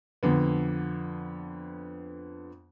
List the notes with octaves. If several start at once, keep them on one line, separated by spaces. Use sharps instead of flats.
F2 D3 B3